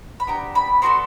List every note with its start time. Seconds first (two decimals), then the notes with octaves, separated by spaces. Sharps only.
0.20 B5
0.27 B3 D4 G4 A#5
0.55 B5
0.82 B3 D4 F#4 A4 C6